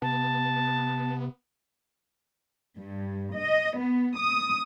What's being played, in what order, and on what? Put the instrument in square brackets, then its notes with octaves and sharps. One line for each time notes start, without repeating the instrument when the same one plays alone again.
[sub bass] C3 [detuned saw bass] B3 [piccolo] A5
[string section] G2
D#5
B3
D#6